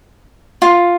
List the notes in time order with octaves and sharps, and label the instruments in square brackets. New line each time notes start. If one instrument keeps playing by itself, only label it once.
[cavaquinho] F4